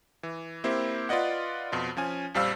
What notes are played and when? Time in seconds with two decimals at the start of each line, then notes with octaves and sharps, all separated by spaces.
0.23 E3
0.64 A#3 C4 E4 G4 C5
1.09 F4 B4 D5 D#5 F#5
1.72 F2 B2 F4
1.97 F3 C#4 G#5
2.34 A#1 F2 G3 C5 F5 E6